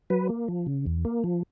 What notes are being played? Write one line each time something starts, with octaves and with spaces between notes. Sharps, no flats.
F#3 B4
A#3
F3
C#3
E2
A#3
F3